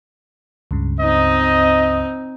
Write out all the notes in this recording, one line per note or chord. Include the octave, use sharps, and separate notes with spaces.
C#2 G2 C#3
C4 D#4 D#5